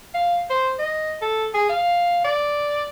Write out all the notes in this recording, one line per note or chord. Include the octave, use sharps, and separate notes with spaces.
F5
C5
D#5
A4
G#4
F5
D5